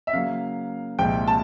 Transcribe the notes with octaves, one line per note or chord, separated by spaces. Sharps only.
E5
C#3 F#3 A#3 F5
C2 A#2 F3 G#3 G5
A5